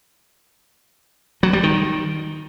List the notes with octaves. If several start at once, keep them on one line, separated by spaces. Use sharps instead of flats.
F#3
G3
D#3